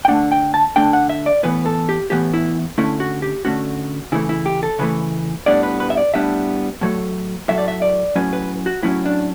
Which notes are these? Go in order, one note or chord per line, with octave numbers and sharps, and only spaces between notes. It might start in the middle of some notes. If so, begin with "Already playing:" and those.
G5
D3 A3 D4 F#5
G5
A5
D3 A3 D4 G5
F#5
E5
D5
A2 E3 B3 B4
A4
G4
A2 E3 B3 G4
E4
D3 A3 C#4 E4
F#4
G4
D3 A3 C#4 F#4
C#3 E3 A3 E4
E4
G4
A4
C#3 E3 A3 B4
A2 G3 B3 D4 D5
B4
B4
E5
D5
A2 G3 B3 D4 E5
A2 F#3 A3
A2 F#3 A3 E5
D5
E5
D5
A2 F#3 C#4 B4
B4
F#4
A2 F#3 C#4 E4
D4